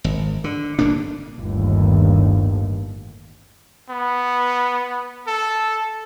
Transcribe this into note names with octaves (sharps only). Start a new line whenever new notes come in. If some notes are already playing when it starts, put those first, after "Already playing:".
G#1
D3
G1 A2 A#3 D4
G1 D#2 A2
B3
A4